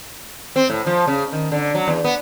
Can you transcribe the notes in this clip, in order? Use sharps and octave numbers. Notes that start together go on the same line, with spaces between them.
C4
A2
F3
C#3
D#3
D3
F#3
E2
B3